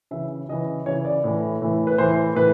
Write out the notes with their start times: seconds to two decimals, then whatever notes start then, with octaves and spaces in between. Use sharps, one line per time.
0.11 C#3 E3 E5
0.49 C#3 E3 D#5
0.86 C#3 E3 C#5
1.05 D5
1.24 A2 E3
1.62 A2 E3
1.87 B4
1.98 A2 E3 C5
2.36 A2 E3 B4